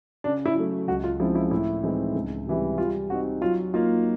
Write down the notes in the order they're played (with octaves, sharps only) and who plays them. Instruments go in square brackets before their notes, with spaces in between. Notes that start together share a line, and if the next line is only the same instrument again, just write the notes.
[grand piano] C#3 [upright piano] D4
[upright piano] E4
[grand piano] F#3 A3
[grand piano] C#2 [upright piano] F#4
[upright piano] F4
[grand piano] C#3 F3 G#3 C4 [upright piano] E4
[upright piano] E4
[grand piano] A2 [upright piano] E4
[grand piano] E3 G#3 C4 D#4
C#2
C3 E3 G3
[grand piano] G3 [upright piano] F4
[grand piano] C4 D#4 [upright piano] F#4
[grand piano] F#3 [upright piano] F4
[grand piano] A#3 D#4 [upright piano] F4